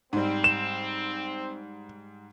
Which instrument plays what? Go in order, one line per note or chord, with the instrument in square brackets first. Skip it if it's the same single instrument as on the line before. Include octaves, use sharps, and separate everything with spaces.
[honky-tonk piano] G#2 G3 [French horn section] C4
[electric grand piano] E7